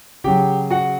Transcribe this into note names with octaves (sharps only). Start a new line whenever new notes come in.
C#3 F#3 G4 G5
F#4 F#5